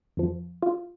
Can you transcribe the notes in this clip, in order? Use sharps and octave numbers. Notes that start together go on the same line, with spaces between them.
F2 F3
F4